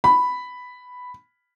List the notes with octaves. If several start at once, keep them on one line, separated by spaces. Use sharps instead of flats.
B5